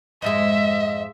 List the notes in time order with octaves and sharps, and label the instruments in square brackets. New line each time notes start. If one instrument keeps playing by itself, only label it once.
[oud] F2 G#2 G#3 [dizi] D#5 [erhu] E5